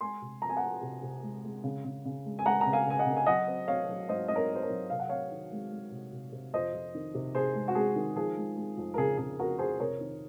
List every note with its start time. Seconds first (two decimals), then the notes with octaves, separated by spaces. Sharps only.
0.01 G#3 G#5 C6
0.22 C3
0.42 F3 A#5
0.49 G#5
0.57 F3 F#5 A#5
0.82 C3
1.02 C3
1.23 G#3
1.44 G#3
1.64 C#3
1.84 C#3
2.05 C#3
2.26 G#3
2.39 G#5
2.45 G#3 F#5 A#5
2.61 A#5
2.66 C#3
2.73 F5 G#5
2.86 C#3 G#5
2.99 D#5 F#5
3.06 C#3
3.16 G#5
3.26 F#3 D#5 F#5
3.47 C4
3.68 C4 C#5 F5
3.89 F#3
4.09 G#2 C5 D#5
4.28 G#2 D#5
4.35 A#4 C#5
4.50 C4
4.55 C5
4.62 A#4 C#5
4.70 F#3
4.90 C3 F5
4.99 F#5
5.09 C4 C#5 F5
5.31 D#3
5.52 G#3
5.72 G#3
5.92 C3
6.12 C3
6.32 C3
6.54 F2 C5 D#5
6.74 F2
6.95 D#3
7.14 C3
7.34 C3 G#4 C5
7.55 G#3
7.68 F#4
7.75 G#3 G#4
7.96 D#3
8.16 F3 G#4
8.36 G#3
8.57 G#3
8.77 F2
8.94 A#4
8.98 C#3 G#4
9.18 C#3 G#4
9.39 F2 F#4 A#4
9.59 F2 G#4 C5
9.80 C3 A#4 C#5
10.00 D#3